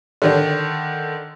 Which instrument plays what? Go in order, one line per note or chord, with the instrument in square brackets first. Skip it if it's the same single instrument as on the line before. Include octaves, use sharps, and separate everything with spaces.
[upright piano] D3 D#3 D4